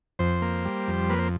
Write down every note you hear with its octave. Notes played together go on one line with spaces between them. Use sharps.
F2 C5
A#3
G3
F2
A#3 B4
C5